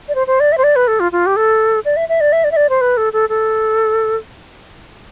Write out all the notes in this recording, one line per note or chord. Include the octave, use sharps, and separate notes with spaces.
D5
C5
C5
D5
E5
C5
D5
B4
A4
F4
F4
G4
A4
D5
E5
E5
D5
E5
D5
E5
D5
C5
B4
A4
A4
A4